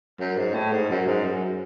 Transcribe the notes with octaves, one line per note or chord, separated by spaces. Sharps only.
F#2
G#2
A2
G#2
F#2
G#2
F#2